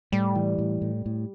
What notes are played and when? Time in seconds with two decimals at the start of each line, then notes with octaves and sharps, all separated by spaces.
0.12 A2 G3
0.35 E3
0.59 A2
0.82 A2
1.06 A2